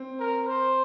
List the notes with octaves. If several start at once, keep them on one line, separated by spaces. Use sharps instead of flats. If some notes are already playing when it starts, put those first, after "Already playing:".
Already playing: C4
A#4
C5